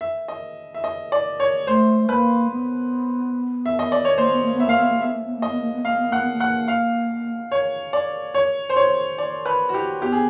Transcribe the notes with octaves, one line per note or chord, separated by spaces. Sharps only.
E5
D#5
E5
D#5
D5
C#5
A3 C5
A#3 B4
B3
E5
D#5
D5
C#5
A#3 C5
B3
A#3
B3
E5
A#3 F5
B3 E5
A#3
B3 E5
A#3
B3
A#3
D#5
B3
A#3
B3
A#3 F5
B3
A#3 F#5
B3
A#3
F#5
F5
C#5
D5
C#5
C5
C#5
D5
B4
F#4
G4
B3 G4
G#4